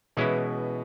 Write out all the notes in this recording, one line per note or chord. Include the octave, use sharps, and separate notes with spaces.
B2 E3 G#3 B3 C#4 E4